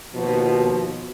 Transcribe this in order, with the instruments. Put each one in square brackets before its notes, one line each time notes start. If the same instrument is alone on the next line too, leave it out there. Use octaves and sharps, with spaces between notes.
[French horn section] D#2 B2 F3